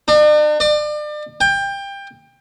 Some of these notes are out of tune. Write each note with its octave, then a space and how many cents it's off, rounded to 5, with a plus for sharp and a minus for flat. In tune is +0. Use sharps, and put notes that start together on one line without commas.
D4 +45
D5 +35
G5 +20